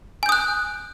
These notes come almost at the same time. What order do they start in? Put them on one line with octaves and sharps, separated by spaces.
G#5 G6 D#6 F#6